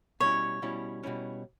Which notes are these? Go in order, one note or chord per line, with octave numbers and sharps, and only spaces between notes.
B2 G3 C#4 E4 C#5
B2 G3 C#4 E4
B2 G3 C#4 E4